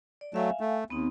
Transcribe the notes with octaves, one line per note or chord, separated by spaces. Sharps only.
D5
F#3 A3 E5 F5 G#5
A3
D#2 B3 C4 D#4